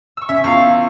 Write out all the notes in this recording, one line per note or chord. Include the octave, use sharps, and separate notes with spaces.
C#6 E6
C#4 E5
E2 E4 F4 F5 C#6